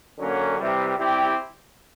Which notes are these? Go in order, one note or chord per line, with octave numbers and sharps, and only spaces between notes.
D3 F#3 A#3 C#4
C3 E3 G3
G3 C4 E4 G4